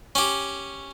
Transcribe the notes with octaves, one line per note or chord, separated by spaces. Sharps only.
C#4 G4